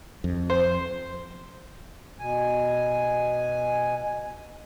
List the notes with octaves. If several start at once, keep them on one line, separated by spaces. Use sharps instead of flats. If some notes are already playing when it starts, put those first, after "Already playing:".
F2
C5
B2 G#5